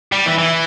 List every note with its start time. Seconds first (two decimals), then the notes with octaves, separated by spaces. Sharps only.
0.12 G3
0.26 E3
0.39 E3